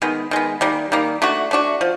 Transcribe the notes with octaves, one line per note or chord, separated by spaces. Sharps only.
D#3 G#3 B3
D#3 G#3 B3
D#3 G3 A#3
D#3 G3 A#3
A3 D4 F#4
A3 D4 F#4
F3